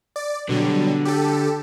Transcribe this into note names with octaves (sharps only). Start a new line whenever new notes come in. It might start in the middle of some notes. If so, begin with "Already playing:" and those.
D5
B2 D3 F#3 G3
G4 A4